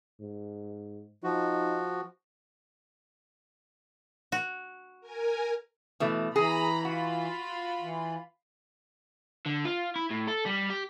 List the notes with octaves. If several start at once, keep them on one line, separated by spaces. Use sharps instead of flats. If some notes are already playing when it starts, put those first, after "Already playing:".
G#2
F3 D#4 F#4
F#4
A#4 G#5
B2 E3 A3
E3 G#4 A#5 B5
F4 F#4 B5
E3
D3
F4
E4
A2
A4
G3
G4